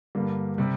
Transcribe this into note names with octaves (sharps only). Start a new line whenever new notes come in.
G2 D3 G3 A#3
C3 G3